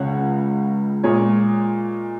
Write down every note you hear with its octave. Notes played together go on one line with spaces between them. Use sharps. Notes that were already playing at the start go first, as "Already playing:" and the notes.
Already playing: C#2 C#3 G#3 C#5 F#5
A#2 G#3 G#4 C#5